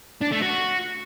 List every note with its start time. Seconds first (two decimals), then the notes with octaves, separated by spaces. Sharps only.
0.21 D4
0.31 A3
0.42 F#4